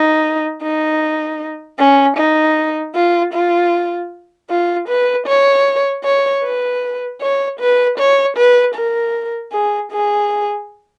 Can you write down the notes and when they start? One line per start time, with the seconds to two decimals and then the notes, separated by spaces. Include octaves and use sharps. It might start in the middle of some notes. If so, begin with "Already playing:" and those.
Already playing: D#4
0.63 D#4
1.79 C#4
2.17 D#4
2.95 F4
3.34 F4
4.50 F4
4.88 B4
5.27 C#5
6.04 C#5
6.44 B4
7.21 C#5
7.60 B4
7.98 C#5
8.37 B4
8.75 A#4
9.52 G#4
9.92 G#4